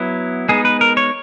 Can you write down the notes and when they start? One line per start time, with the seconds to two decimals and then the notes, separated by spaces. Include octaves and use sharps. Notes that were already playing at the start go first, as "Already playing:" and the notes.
Already playing: F#3 B3 E4
0.49 G#3 B3 D#4 G#4
0.65 B4
0.81 A#4
0.97 C#5